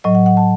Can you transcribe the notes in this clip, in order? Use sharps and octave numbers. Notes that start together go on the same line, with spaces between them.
A2 F#3 D#5
F#5
F#5
A5